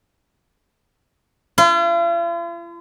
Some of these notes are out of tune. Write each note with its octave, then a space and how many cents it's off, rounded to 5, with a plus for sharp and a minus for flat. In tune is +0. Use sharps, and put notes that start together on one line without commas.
F4 -45